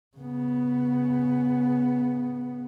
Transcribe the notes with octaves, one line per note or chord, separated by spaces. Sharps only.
C#3 B3